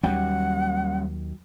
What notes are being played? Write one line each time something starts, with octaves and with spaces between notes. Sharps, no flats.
D#2 F#3 G3 A#3 C#4 F#5 G5